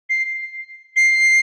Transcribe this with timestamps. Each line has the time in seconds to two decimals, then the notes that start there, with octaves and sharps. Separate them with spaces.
0.10 C7
0.96 C7